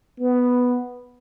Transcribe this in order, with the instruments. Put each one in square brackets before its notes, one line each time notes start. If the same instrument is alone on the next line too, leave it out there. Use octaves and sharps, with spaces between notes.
[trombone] B3